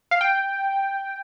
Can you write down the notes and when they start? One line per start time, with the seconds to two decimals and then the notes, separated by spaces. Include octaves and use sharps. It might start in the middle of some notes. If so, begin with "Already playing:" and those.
0.11 F5
0.21 G5